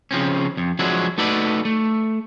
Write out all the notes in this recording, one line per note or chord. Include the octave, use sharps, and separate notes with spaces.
C#3 F3 C4 C#4
F2
F3 F#3 G#3 D4 E4 F#4
A3 D#4 F#4 A4 B4 D5
A3